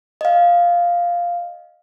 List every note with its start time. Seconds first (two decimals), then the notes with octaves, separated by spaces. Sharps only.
0.21 D#5 F5